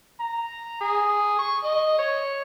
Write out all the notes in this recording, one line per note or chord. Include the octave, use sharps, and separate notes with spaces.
A#5
G#4
C#6
D#5
C#5